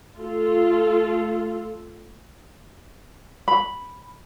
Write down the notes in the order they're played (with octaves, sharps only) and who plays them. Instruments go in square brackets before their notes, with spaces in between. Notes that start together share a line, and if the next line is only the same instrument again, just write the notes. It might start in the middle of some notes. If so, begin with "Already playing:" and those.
[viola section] A3 F4 A4
[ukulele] B5